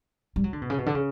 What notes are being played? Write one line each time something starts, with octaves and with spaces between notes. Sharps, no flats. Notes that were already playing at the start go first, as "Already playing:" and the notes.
G3
F#3
D3
B2
C#3
B2
D3
C#3